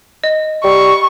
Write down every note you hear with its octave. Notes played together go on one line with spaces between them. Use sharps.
D#5
G3 C#6